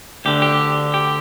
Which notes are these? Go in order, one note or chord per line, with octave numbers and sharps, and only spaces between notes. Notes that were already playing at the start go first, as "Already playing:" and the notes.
D2 D3 G4
G4
G4